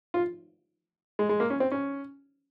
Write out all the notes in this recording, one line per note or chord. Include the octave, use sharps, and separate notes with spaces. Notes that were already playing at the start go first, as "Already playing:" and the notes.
F4
G#3
G#3
A#3
C#4
C4
C#4